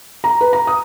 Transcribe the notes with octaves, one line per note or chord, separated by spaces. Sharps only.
A#5
B4
A#5
D#6